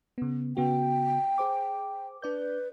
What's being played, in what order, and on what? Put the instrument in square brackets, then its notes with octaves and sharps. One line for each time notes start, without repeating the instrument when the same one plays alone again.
[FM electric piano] C#3 B3
[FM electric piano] C#3 B3 F#4 [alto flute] G5
[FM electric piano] G#4 C5 D6
[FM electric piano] D4 D5 G6 [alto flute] B4